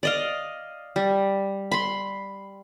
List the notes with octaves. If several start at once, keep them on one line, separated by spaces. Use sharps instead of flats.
D5 D#5 F5
G3
B5 C6